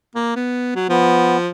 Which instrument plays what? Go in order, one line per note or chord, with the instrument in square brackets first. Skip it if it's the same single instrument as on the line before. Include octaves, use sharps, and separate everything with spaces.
[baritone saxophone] A#3
B3
F#3
[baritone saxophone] F3 [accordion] B3